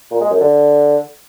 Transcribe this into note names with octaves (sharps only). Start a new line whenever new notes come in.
A#2
G#3
F#2
D3